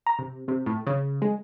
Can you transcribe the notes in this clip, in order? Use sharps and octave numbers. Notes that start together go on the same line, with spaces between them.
A#5
C3
C3
A2
C#3
G#3